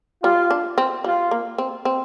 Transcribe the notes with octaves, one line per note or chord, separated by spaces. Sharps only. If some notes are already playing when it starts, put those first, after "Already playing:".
G3 F4
D4
C4
G3 F4
A#3
C4
C4